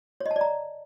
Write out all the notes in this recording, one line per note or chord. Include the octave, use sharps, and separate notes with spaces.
C#5
D#5
A5
D5
A#5